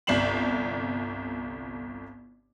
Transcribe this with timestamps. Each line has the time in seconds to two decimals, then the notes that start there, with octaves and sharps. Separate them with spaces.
0.07 G1 C2 D5 C7 E7 F#7